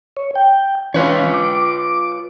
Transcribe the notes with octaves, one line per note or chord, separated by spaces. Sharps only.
C#5
G5
E3 C#4 F4 B4 C#5
D6